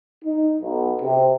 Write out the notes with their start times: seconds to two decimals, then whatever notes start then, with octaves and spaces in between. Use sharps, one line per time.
0.24 D#4
0.61 B1
1.01 C3